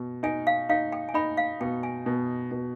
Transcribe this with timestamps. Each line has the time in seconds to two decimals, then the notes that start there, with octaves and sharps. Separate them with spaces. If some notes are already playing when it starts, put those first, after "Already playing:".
Already playing: B2
0.23 D#4 G#5
0.47 F5
0.69 D#4 F5
0.92 G5
1.09 G#5
1.14 D#4 B5
1.37 F5
1.61 B2 G5
1.83 G#5
2.06 B2
2.51 B2